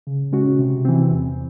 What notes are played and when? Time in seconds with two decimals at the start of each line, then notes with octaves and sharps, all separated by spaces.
0.07 C#3
0.33 G#3 C#4 F#4
0.59 C3
0.85 E3 C4
1.11 E2